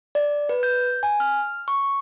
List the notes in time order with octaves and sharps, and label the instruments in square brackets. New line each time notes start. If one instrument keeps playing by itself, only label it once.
[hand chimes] D5
B4
G6
G#5
F6
C#6